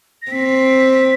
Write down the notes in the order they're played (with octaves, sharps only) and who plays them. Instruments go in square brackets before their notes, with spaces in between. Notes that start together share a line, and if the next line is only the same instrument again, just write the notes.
[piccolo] A#6
[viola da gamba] C4 [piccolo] B6